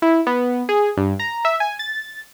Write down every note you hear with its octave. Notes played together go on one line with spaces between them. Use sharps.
E4
B3
G#4
G2
A#5
E5
G#5
A6